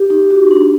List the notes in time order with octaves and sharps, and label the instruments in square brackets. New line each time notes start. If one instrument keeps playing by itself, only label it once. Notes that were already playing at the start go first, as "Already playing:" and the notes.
Already playing: [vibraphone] G4
D#4
F#4
D4